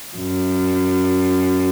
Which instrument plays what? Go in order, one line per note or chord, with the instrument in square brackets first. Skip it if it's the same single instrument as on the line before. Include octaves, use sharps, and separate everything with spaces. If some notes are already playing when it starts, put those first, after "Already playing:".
[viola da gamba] F#2